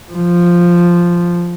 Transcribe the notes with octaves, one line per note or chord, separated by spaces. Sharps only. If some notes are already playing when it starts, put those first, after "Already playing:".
F3